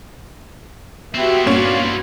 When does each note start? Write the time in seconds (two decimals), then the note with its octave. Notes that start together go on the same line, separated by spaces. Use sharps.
1.15 B3 C4 E4 F#4 G4 E5
1.46 G2 A#2 C#4 D5 F5